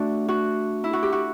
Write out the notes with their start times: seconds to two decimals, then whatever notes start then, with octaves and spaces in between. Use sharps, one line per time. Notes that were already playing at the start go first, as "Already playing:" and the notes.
Already playing: A3 D4 F#4
0.28 F#4
0.84 E4
0.93 F#4
1.03 G4
1.12 F#4